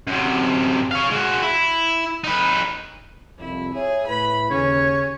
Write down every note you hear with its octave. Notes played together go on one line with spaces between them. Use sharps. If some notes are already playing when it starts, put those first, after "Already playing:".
F#2 C3
C#5 F5
G#3 F#4
E4
D#4 B4
C2 F2 E4
G#4 C#5 E5
A2 E4 B4 B5
D#2 C#3 C#4 C#5